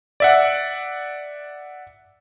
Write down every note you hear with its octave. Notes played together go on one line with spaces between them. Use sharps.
D5 E5 F#5